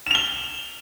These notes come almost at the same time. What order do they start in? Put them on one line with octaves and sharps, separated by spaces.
E7 F7 G7